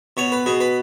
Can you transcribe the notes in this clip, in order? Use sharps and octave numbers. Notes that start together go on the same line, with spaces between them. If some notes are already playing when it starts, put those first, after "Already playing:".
B2 C#5
B4
B2 G#4
B4